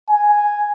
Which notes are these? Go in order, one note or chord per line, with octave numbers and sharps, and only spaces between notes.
G#5